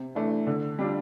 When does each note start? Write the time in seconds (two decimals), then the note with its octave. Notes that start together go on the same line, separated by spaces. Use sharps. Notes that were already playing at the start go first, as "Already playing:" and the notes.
Already playing: C3
0.15 E3 A3 D4
0.47 D3
0.79 G3 D4 F4